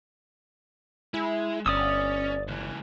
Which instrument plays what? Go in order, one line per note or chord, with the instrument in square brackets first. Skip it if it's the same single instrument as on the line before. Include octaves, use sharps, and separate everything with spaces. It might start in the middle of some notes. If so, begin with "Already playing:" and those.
[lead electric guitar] G#3 [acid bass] E4
[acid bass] G1 [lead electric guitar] C#4 [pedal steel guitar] D5 D#6 E6
[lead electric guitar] C#2 E3